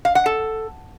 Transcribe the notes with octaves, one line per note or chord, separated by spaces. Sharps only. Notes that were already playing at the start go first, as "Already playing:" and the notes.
F5
F#5
A4